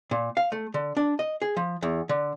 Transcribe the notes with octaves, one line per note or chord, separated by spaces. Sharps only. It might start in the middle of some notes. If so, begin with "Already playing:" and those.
A#2
F5
A3
D3
D4
D#5
G#4
F3
E2
D3